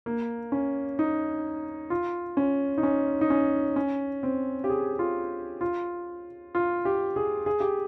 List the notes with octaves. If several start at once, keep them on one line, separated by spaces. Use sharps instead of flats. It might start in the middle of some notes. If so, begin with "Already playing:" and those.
A#3
C#4
D#4
F4
C#4
D#4
C#4
D#4
C#4
C#4
C4
G4
G#4
F4
F4
F4
G4
G#4
G#4
G4